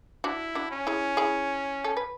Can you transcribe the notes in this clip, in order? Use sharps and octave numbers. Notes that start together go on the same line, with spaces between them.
D4 E4 F#4
D4 F#4
C#4
E4 G#4
E4 G#4
A4
B4